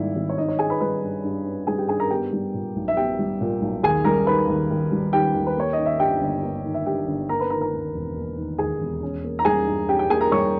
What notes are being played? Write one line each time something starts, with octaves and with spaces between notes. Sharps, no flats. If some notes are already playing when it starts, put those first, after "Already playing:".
Already playing: G#1 G#2 G3 A#3 E4
G#1
C#5
G2 D#4 D#5
C#5
C#4 G#4 G#5
B4 B5
G3 B4 B5
G2
G2
C#4
G3 G#4 G#5
G4 G5
G2 G#4 G#5
A#4 A#5
B3 G4 G5
G3
A#2
B1
E5
B3 G4 G5
G3
A#2
B1
D#2 G#4 G#5
G3 A#4 A#5
D#3 B4 B5
D#2
D#2
G3
D#3 G4 G5
D#2
B4
A#3 C#5
D#3 D#5
E5
G2 G4 G5
G1
A#3
D#3
E5
G2 G4 G5
G1
A#3 A#4 A#5
B4 B5
D#3 A#4 A#5
A#4 A#5
D#2
E1
A#3
D#3
D#2 G#4 G#5
E1
C#4
A#3
A#5
G3 G#4 G#5
G2
C#4 G4 G5
G4 G5
A#3 G#4 G#5
A#4 A#5
G3 C#5 C#6